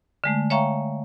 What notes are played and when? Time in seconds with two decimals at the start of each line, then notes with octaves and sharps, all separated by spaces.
0.24 D3 G#3 A3
0.50 C#5 E5 F5 G5 A#5 C#6